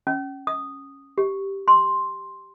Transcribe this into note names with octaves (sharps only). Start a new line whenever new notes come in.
C#4
D#6
G4
C6